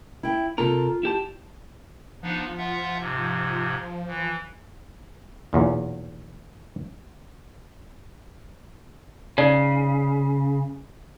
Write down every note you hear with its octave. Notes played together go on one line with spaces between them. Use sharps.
E4 G5
C3 F4 A4 A#4
E4 G4 A5
F3 B3 D4 D#4
F4 E5 F#5
G#2 C3
E3
B1 E2 A#2
C#3 D#4 D5